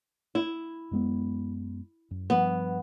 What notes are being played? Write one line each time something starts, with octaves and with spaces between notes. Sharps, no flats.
E4
F#2 G#3 B3
F#2
G2 F3 B3